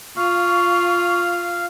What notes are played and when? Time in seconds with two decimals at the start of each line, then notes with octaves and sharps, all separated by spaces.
0.16 F4 F5 C#6